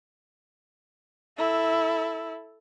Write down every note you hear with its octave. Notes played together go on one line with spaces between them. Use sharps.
E4 A4